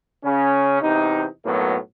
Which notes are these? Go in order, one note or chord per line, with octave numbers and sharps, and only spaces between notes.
C#3 C#4
E2 C3 D#4
B1 A2 F#3 A#3 B3